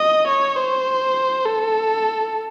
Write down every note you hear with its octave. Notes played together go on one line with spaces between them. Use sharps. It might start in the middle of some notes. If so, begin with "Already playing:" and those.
Already playing: D#5
C#5
C5
A4